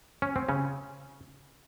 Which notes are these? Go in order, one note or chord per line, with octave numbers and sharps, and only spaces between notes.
C#4
C4
C#3 C#4